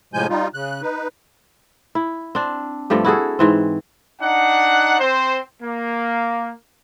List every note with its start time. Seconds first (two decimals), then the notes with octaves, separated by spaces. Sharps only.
0.14 A2 C3 F3 G#3 G#5 G6
0.29 G3 D#4 F4
0.54 C#3 F#6
0.82 D#4 B4
1.95 E4
2.35 C4 D4
2.90 G2 F3 A3 G4
3.05 E4 F#4 G#4 A4
3.39 G#2 E3 C4
4.22 D4 D#4 F#5
5.00 C4 C5
5.63 A#3